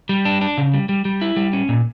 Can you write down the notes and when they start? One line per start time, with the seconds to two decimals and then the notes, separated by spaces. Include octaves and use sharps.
0.09 G3
0.25 D4
0.41 D4
0.58 C#3
0.73 G3
0.89 G3
1.05 G3
1.22 E4
1.37 G3
1.53 C#4
1.69 A#2